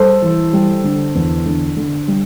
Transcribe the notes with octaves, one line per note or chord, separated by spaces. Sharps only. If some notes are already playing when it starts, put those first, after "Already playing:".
Already playing: G3 A4 C5
E3
G3
D3
E2
D3
D3
G3